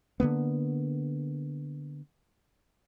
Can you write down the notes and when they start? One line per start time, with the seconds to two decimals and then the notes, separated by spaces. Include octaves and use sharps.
0.20 D3 D#3 A#3 B3